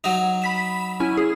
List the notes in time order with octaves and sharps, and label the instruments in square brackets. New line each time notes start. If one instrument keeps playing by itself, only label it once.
[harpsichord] F#3 D#4
[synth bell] B5 B6 E7
C#4 E4 G#5
G#4